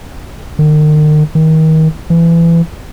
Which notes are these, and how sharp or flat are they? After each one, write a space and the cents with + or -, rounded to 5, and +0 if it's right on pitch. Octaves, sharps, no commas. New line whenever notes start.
D#3 -40
D#3 +30
E3 +25